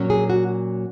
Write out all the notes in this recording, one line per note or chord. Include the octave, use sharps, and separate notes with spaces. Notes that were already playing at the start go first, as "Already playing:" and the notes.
Already playing: A#2 F#3 C#4
G#4
F#4